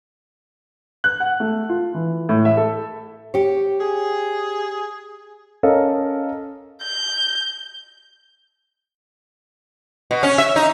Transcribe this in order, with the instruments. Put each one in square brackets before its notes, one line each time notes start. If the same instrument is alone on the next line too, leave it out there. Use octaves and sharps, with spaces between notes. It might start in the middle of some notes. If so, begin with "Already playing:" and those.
[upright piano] F#6
F#5
A3
F4
E3
A2
E5
A4
[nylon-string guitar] G4 C#5
[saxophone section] G#4
[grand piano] C#4 A4 A#4 D#5 F5
[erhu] G6
[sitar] B2
C#4
E5
D#4